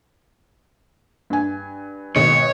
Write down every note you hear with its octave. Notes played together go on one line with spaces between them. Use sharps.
G2 G#5
G#1 B2 C#5